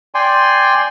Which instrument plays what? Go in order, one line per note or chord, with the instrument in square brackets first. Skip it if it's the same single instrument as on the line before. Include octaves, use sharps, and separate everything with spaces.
[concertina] D5 G5 G#5 C6